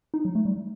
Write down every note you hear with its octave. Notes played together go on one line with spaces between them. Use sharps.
D#4
F#3
A3
G3